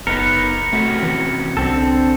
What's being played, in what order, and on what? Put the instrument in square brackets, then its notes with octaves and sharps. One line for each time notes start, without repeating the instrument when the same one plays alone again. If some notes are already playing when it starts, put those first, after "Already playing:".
[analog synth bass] F#1 [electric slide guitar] B3 D#4 [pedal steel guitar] A#4 B4 [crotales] C#7
[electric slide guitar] C3 C#4 F#4 [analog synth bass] A3
[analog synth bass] E3
[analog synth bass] C2 [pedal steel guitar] D3 C4 A4